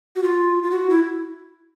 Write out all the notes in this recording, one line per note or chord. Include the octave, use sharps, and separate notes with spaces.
F#4
F4
F4
F#4
E4